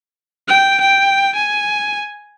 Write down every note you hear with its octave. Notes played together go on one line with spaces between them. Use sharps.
G5
G5
G#5